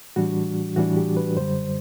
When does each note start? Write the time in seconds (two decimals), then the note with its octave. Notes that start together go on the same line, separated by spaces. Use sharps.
0.16 A2 E3 G3 D4 F#4
0.76 A2 E3 G3 D4 F#4
0.97 G4
1.17 B4
1.37 F#2 D3 G3 C5